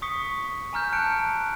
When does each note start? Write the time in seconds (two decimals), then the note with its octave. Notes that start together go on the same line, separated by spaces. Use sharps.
0.02 C#6 D#6 B6 C#7
0.73 G#5 A#5 F6 G6
0.93 A5 F6 F#6 C#7 D7